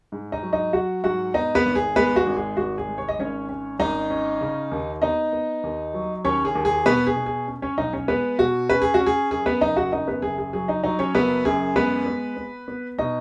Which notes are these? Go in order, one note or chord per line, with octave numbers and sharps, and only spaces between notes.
G#2
D#4 D#5
F#3
D#4 D#5
F#3 F#4 F#5
G#2 F#4 F#5
B3 D#4 D#5
B3 B4
G#1
G#4
G#3 B3 B4
F#4
G#1
G#4
G#1 F#4
G#4
G#3
C#5
D#5
G#1 C#4 C#5
C#4
G#1 D#4 D#5
C#4
C#3
D#2
B3 D#4 D#5
B3
D#2
F#3
D#2 C#4 C#5
G#4
D#2
G#4
B2 B3 B4
G#4
B2
G#4
C#4
C#4 C#5
B1 D#4 D#5
C#4 C#5
G#3 B3 B4
B2 F#4
C#4 B4
G#4
F#4
C#4
G#4
F#2 G#4
B3 B4
F#1 D#4 D#5
F#4 F#5
F#2 D#4 D#5
B3 B4
F#1 G#4
G#4
F#3 G#4
D#4 D#5
F#3 D#4 D#5
C#4 C#5
F#1 B3 B4
F#2 G#4
G#3 B3 B4
B3
B3
B3
B2 D#4 D#5